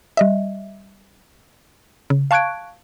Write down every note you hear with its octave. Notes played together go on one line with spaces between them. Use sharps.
G3 D#5 E5
C#3
F5 A5 C#6 F#6 G#6 D7